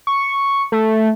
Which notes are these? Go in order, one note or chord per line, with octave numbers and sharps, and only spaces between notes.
C#6
A3